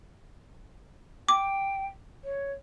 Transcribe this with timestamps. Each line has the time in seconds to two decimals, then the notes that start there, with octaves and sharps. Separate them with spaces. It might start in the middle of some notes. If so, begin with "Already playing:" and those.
1.29 G5 D6
2.24 C#5